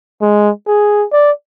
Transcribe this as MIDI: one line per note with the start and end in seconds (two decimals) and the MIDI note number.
0.21 0.50 56
0.67 1.05 68
1.12 1.31 74